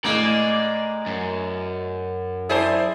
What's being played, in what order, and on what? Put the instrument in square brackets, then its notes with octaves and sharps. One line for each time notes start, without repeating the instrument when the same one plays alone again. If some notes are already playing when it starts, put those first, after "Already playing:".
[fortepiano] A2 [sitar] G#3 A#3 [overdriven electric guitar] D5
[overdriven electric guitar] F#2
[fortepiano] E4 D5 A5 [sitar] G#4 C5